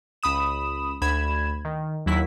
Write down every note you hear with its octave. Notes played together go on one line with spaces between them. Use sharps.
C#2 B5 D#6 E7
D2 B5 G#6 E7
D#3
D#2 F#3 E4 B6